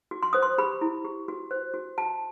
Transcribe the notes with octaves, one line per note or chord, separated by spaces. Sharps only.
F#4
C6
C5 D#6
C6
G4 B5
E4
G4
F#4
C5
F#4
F#4 A5